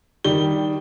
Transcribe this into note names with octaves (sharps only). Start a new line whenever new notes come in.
D#3 G3 G7